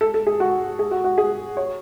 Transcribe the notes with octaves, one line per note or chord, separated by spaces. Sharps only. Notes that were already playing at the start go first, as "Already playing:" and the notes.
A4
A4
G#4
F#4
G#4
F#4
F#4
G#4
C#5